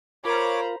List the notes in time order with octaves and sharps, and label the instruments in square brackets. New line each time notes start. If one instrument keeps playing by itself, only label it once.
[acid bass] F4 [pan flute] A#4 [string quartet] C5 A#5 B5 [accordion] C#5 D6